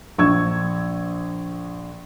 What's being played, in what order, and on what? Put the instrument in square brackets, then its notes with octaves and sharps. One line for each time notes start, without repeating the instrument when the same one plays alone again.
[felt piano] A#1 C#6 E6 G#6